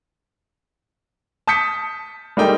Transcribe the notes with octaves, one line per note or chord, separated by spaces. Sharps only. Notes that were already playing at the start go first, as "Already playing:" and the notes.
A5 D#6 G6 B6 C#7
G3 G#3 A#3 D#4 A4 G5